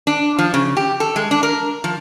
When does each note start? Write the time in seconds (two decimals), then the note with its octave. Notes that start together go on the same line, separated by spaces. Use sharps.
0.07 D4
0.39 F3
0.54 C#3
0.77 G4
1.00 A4
1.16 G#3
1.31 D4
1.43 A#4
1.84 F3